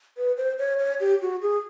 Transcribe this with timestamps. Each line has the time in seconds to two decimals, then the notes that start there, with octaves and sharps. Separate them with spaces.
0.17 B4
0.37 C5
0.59 C#5
0.79 C#5
1.00 G4
1.21 F#4
1.42 G#4